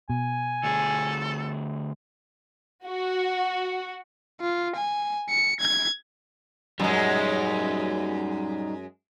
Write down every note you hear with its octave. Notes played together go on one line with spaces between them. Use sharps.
B2 G#5
D2 G#4 A4
F#4
F4
G#5
C#7
G#6
F#2 G3 G#3 D#4